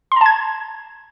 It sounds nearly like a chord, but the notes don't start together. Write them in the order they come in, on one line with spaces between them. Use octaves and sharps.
C6 A#5 A5 G#6